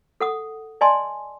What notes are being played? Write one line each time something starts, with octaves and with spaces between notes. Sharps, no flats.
A4 F#5 D#6
D5 D#5 G#5 A5 C6